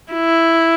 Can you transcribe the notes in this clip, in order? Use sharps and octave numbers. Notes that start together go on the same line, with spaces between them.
E4